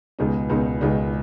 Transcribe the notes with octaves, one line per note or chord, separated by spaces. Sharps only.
C#2 B2 G#3 B3 D#4
C#2 B2 G#3 B3 D#4
C#2 B2 G#3 B3 D#4